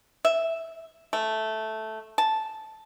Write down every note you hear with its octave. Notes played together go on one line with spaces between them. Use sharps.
E5
A3
A5